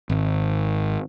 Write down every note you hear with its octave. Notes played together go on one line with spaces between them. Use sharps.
G#1